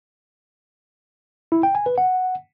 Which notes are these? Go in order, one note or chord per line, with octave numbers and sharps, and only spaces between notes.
E4
G5
G#5
B4
F#5